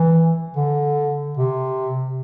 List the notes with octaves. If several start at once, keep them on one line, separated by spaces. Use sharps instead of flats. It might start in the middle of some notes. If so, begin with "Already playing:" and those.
Already playing: E3
D3
C3